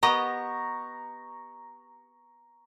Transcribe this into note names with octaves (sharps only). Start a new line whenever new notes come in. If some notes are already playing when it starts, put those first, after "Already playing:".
B3 G4 D#5 A#5 C#6